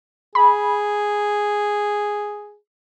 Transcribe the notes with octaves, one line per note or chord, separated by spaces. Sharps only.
G#4 B5